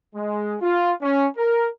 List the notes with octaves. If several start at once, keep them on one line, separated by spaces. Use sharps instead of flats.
G#3
F4
C#4
A#4